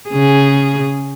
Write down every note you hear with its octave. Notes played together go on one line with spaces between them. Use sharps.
C#3 G#4